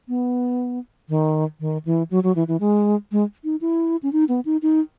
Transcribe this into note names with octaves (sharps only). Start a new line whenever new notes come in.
B3
D#3
D#3
E3
F#3
F#3
E3
E3
G#3
G#3
D#4
E4
C#4
D#4
B3
D#4
D#4